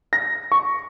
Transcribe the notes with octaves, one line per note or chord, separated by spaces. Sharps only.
A#6
C#6